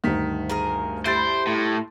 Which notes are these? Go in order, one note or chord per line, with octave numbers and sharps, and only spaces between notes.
D2 G2 D#3 B6
A#3 G#4 A#4
G3 E4 A4 C5 A6 D7
A2 C6